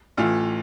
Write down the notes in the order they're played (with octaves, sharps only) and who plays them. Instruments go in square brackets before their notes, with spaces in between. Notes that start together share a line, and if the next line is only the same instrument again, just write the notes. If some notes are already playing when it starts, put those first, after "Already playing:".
[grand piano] A1 A2 E3 F4